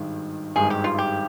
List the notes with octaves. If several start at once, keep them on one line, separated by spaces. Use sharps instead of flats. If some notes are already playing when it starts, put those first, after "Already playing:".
Already playing: G#1 G2 D#3 G#3
G#1 G2 D#3 G#3 G#4
G4
F4
G4